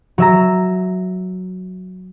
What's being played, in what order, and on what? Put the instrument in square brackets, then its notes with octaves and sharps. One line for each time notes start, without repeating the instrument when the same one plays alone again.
[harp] F#3 E5 A#5